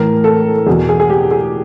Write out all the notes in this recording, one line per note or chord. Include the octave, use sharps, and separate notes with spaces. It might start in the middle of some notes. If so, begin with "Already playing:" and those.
Already playing: A2 E3 A#4
A4
E2 B2 G#4
G#4
G#4
G4
G#4